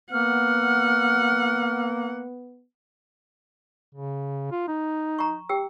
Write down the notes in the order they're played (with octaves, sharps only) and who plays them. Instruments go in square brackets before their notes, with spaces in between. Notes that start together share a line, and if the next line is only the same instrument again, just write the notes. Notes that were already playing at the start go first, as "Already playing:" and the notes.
[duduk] A#3 [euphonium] B3 [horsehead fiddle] F#5 [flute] F6
[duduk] C#3
F4
D#4
[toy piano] A#5 C#6
G4 G5 E6